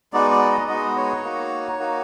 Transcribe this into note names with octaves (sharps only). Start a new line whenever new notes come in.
G#3 B3 D#4 F#4 D5
D5
D#5
G#3 B3 D#4 F#4 D#5
C#5
A#3 D#4 F#4
A#3 D#4 F#4